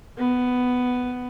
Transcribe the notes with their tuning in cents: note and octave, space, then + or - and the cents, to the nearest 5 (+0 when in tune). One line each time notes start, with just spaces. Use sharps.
B3 +10